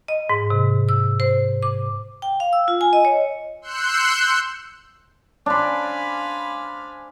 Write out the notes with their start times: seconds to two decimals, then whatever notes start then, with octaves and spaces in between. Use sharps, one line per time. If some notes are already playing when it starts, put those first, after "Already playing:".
0.08 D#5
0.30 G#2
0.50 C3
0.89 E6
1.20 C5
1.63 D6
2.22 G5
2.40 F5
2.53 E6
2.68 F4
2.81 G#5
2.93 D#5
3.05 C#5
3.62 C6 E6 F#6 G6 C#7
5.46 D4 C5 F5 G#5 B5